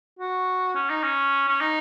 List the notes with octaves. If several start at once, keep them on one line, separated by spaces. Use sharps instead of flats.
F#4
C#4
D#4
C#4
C#4
D#4